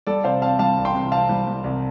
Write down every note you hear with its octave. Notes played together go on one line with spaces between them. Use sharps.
G3 A4 D5
C3 C5 F5
C4 F5 A5
G3 F5 A5
C2
G5 C6
C3
C4 F5 A5
G3
G3
C2